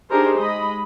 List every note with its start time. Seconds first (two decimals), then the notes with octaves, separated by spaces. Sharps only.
0.10 D4 D#4 G4 G#4 A#4 C5
0.41 G#3 D#5 B5